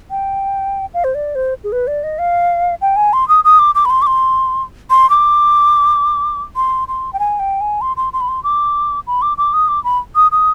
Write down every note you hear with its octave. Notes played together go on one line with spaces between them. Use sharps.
G5
F5
C5
D5
C5
G#4
B4
D5
D#5
F5
G5
G#5
C6
D#6
D#6
D6
D6
B5
C6
D6
C6
C6
D6
C6
C6
G5
G#5
G5
G#5
C6
C6
C6
B5
C6
D6
B5
D6
D6
D#6
D6
B5
D#6
D#6